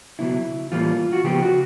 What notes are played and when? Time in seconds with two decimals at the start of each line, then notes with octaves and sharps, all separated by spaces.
0.19 C#2 B2 F#3 E4
0.72 A2 E3 G3 A#3 F4
1.13 F#4
1.24 C#2 C#3 F3 G#3 B3 G4
1.42 F#4